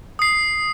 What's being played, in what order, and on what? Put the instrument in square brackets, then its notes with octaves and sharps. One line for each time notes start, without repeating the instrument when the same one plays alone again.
[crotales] D#6 C7